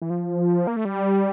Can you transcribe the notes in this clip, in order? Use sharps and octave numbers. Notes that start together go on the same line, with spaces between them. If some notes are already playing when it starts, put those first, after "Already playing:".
E3
F3
A#3
A3
G3